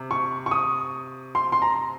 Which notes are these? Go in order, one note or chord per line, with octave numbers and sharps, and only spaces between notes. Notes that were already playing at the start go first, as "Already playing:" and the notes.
Already playing: C3
C#6
C#6
D#6
C6
C6
A#5